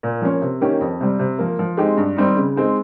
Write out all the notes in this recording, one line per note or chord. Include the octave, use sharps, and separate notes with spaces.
A#2
F3 A#3 C#4
C3
D#3 A#3 C#4 G4
F2
C3 G3
C3
F3 A#3
F3
G#3 C4 D#4 G4
G2
D#3 G3 C4 D#4
C#3
G#3 C4 D#4